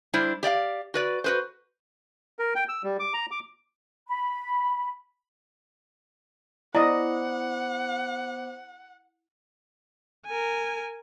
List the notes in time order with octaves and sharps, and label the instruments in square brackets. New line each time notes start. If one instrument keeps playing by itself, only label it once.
[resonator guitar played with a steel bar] G3 D4 E4 C5
G4 D5 E5 F5
F#4 B4 D5
F#4 B4 C5
[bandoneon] A#4
G5
E6
G3
D6
A#5
D6
[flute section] B5
[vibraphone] B3 C5 D6 [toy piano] E4 [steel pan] D5 D#5 [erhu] F#5
[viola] A#4 G#5